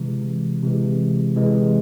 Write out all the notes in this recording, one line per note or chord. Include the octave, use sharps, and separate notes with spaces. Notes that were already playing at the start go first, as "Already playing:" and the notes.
Already playing: C3 E3 G#3
C3 E3 G#3
C3 E3 G#3